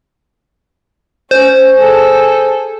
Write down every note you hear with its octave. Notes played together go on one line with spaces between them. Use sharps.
C#4 C5
G#4 A4